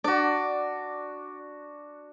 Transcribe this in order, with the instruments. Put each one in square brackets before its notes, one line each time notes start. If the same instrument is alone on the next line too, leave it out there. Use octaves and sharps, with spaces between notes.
[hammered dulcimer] D4 F#4 [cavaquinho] D5